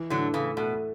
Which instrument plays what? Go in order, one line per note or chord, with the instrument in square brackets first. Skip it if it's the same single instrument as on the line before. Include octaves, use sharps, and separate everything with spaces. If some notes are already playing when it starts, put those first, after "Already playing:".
Already playing: [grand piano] E3
[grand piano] A2 [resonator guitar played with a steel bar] D3 F#3
[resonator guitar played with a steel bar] C#3 E3 [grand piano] A3
[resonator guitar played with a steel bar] B2 [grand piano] A3